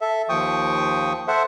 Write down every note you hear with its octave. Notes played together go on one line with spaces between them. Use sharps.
A4 E5
D#2 F3 G5 C#6 D#6
A4 C5 E5 F#5